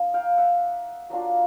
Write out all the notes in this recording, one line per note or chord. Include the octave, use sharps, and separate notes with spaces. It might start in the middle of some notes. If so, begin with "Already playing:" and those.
Already playing: A#3 D#4
F5 G5
E5 F#5
F#3 A#3 D4 F4